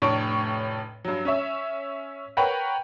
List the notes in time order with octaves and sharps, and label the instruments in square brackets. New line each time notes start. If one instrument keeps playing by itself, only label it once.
[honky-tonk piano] F1 A2 D4 C#5 C#6 D7
G2 F#3
C#4 C#5 E5
A#4 B4 C#5 F#5 G5 B5